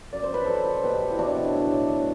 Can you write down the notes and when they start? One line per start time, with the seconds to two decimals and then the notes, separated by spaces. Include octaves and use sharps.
0.13 F#2 D5
0.24 C5
0.31 F#3 B4
0.44 F#3 A4 C5
0.67 F#2
0.83 B2 G4 B4
1.02 F#3
1.10 E4
1.18 F#3 D4 F#4
1.36 B2
1.54 A2
1.72 F#3
1.89 F#3